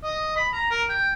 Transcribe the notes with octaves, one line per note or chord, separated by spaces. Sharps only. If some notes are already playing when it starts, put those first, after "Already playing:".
D#5
B5
A#5
A#4
G5